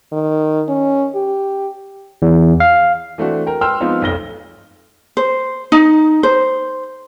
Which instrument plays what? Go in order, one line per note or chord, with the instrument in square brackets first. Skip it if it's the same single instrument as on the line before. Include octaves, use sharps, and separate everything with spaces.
[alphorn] D#3
C#4
G4
[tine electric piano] E2
F5
[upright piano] E3 A3 C4 D4 F#4
A#4 G5
B4 G5 C6 E6 F6
F3 G#3 B3 C4 D#4 F4
F1 B1 F2 A#6 G7
[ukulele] C5
D#4
C5